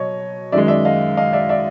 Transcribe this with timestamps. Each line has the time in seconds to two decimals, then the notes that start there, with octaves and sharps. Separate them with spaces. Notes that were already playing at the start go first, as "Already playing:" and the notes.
Already playing: B2 F#3 C#5 D#5
0.52 F#2 D#3 G#3 D5 E5
0.68 D5 E5
0.85 D#5 F5
1.17 D#5 F5
1.33 D5 E5
1.49 D5 E5